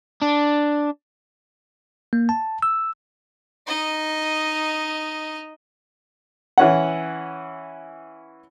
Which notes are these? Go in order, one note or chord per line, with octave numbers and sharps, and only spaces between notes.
D4
A#3
A5
E6
D#4 D#5
E3 C#4 F#5